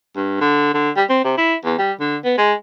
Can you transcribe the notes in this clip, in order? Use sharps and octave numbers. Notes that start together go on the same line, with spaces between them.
G2
D3
D3
G3
C4
C3
E4
E2
G3
D3
B3
G#3